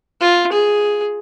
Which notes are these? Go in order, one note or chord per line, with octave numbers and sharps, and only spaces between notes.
F4
G#4